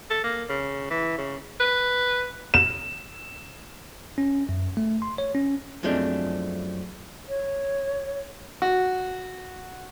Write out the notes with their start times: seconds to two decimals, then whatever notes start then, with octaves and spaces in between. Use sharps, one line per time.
0.10 A4
0.23 A#3
0.49 C#3
0.90 E3
1.18 C#3
1.60 B4
2.54 E7
4.18 C#4
4.49 F#2
4.77 A3
5.02 C6
5.18 C#5
5.35 C#4
5.83 F#2 F3 G#3 A3 C4 D4
7.29 C#5
8.62 F#4